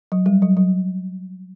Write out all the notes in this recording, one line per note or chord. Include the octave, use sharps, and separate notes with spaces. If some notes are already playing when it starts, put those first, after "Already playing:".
F#3
G3
F#3
F#3